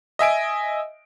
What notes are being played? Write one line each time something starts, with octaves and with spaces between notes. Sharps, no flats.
D#5 E5 G#5 D7